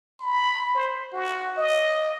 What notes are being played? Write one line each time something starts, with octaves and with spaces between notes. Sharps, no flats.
B5
C5
F#4
D#5